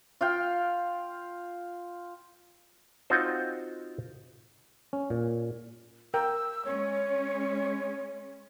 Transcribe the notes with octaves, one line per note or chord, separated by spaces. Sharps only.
F4 F5 G5
C4 D#4 F4 F#4 C5
C#4
A#2
A#4 G5 E6
G#3 C#4 C#5